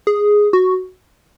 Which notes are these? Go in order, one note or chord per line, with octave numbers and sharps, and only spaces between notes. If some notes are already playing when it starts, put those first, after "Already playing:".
G#4
F#4